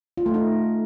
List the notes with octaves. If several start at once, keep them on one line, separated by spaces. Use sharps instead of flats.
F4
A3
D#4